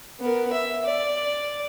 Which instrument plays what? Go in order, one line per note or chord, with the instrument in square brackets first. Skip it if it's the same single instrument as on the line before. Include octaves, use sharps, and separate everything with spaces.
[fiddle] B3 A#4
E5
D5